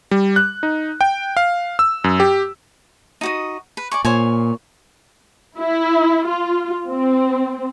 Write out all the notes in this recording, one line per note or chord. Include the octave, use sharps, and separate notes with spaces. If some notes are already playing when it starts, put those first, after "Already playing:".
G3
F#6
D#4
G5
F5
E6
F#2
G4
D#4 F#4 D#5
B4
D5 G#5 C#6
A#2 C5 C#5 G#5
E4
F4
C4